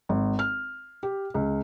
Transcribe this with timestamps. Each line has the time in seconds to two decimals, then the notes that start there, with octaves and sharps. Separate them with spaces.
0.09 G#1
0.39 F6
1.03 G4
1.34 C#2